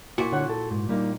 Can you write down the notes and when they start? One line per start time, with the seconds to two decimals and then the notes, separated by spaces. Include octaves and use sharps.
0.18 A#2 E4 F#4
0.32 D3 C#5 F#5
0.50 A4
0.71 G#2
0.89 G3 A#3 D#4